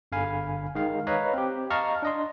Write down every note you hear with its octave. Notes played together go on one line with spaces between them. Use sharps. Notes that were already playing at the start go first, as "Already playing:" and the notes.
G1 D3 F5 G#5 B5
D#3 G#3 F5
B4 C#5 D#5 F5 A#5 B5
C4 G4
D#5 F5 A5 A#5 C#6 F6
D4 D#5 C6